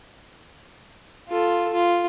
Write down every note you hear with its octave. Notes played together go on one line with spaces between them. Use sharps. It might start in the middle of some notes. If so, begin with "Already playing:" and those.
F4 A4
F4